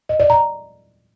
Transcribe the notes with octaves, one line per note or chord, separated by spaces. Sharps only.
D#5
D5
A#5